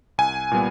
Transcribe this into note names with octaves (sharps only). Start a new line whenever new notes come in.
C2 G#5
A#2 G3 B3